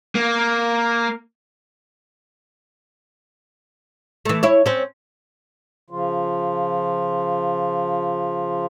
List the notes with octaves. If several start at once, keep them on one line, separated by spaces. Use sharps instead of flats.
A#3
E3 A3
E4 C#5
C4 C#4
C#3 F3 F4